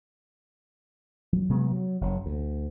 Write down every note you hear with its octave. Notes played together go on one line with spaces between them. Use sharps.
F#3
C3 F#3 G#3 B3
F#3
F#1 F#3
D2